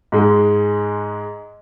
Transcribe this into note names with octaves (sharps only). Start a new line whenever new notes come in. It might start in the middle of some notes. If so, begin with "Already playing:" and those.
G#2 G#3